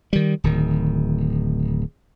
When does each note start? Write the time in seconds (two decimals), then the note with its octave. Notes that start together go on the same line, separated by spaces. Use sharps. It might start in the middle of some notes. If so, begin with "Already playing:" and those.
0.13 D#3 G3
0.44 D1 D#3